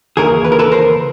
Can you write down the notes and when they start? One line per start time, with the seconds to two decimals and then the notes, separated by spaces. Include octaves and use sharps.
0.17 D#2 C#3 E3 G#4 A#4
0.44 B4
0.52 A#4
0.59 A4 B4
0.72 A#4 C5